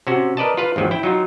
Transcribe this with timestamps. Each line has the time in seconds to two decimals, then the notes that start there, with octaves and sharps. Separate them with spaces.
0.07 C3 C#4 F#4
0.37 A#4 B4 D5 D#5 A5
0.57 F4 B4 F5
0.76 G#1 D#2 F3 F#3
0.91 E4 G5
1.03 F#3 D#4 F4